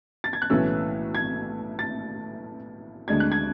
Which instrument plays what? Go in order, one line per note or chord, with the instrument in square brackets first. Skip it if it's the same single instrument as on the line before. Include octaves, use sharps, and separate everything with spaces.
[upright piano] A6
G#6
F#6
B1 A2 E3 A3 C#4 E6
G#6
A6
D2 D3 G#3 D4 G#6
F#6
G#6